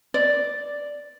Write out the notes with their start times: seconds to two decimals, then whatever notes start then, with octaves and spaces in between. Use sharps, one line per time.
0.14 D5